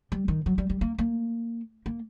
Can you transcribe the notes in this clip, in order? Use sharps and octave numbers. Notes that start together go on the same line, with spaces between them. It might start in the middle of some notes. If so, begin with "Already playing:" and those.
G3
D#3
F#3
G3
G3
A#3
A#3
A#3